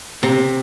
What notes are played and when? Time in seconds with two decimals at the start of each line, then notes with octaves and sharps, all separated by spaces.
0.23 C3